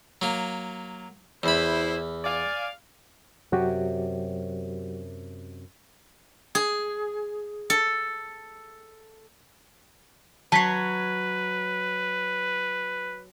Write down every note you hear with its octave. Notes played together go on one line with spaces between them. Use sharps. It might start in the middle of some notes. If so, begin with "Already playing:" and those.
F#3 A#3
E2 E4 C5 B5
D5 F5 G#5
F#2 C3 F#3 F#4 G4
G#4
A4
F#3 B4 C#5 A5 B6 C7